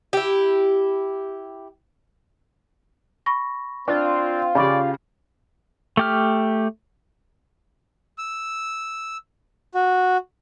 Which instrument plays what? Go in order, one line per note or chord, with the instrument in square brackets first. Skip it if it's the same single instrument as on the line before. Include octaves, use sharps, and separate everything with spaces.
[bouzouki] E4 G4
[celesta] B5 C#6 A#6
[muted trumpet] C4 [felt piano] D4 [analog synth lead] F4
[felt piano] C#3 G4 [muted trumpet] D5 [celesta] G#5 B5 C#6
[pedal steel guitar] A3 G4 F6
[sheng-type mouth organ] E6
F#4